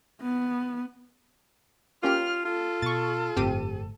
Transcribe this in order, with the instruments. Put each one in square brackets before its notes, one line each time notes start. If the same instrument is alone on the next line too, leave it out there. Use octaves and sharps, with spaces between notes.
[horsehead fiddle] B3
[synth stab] A#3 C#4 G4 [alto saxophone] F4 [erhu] F6
[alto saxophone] F4 [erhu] A4
[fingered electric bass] B2 [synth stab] C#6 A6
[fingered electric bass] G1 F2 A2 [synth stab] C4 G4 D#7